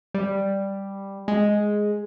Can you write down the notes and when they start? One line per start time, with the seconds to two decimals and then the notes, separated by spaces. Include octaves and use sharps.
0.14 G3
1.28 G#3